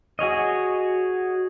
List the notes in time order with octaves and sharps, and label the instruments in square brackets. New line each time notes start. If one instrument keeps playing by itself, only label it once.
[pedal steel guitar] F#4 G#4 C#5 D#5